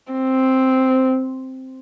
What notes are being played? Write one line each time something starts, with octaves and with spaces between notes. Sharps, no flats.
C4